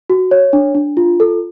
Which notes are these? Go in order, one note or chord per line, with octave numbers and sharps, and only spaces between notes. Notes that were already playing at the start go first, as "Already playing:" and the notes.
F#4
C#5
D4
D4
F4
A4